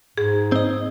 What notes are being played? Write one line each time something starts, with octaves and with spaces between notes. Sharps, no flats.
G#2 G#4
C4 D#5